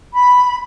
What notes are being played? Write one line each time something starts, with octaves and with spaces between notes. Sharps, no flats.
B5